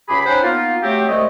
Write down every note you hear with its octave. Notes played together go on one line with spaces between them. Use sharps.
C#2 C#3 G4 G#4 B5
C#4 D#4 C5 F#5 G5 B5
A#3 B3 D#4 F4
F#3 A3 C4 G4
C2 G#3 A3 D#5